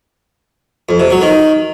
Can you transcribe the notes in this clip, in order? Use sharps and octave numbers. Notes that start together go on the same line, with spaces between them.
F2
C3
F#3
D#3